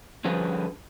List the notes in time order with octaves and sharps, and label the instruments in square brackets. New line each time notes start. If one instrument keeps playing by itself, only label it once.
[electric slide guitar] D3 F3 G3 C#4 G#4 B4